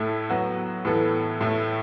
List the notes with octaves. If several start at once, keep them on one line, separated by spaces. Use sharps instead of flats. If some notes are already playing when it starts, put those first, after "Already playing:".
Already playing: A2 A3 E4 A4
F#3 B3 F#4
A2 E3 B3 A4
A2 A3 E4